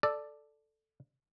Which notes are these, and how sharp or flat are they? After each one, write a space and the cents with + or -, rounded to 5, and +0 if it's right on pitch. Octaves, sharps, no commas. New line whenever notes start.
A4 +0 D5 +5